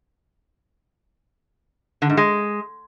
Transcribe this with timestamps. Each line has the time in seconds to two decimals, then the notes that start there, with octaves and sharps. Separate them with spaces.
2.02 D3
2.10 G#2
2.17 G#3